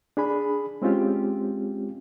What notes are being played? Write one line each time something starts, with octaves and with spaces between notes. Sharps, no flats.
D4 G#4 B5
G#3 C4 C#4 F4 G4